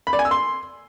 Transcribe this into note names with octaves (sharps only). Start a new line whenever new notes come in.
B5
D5
G#5
E6
C6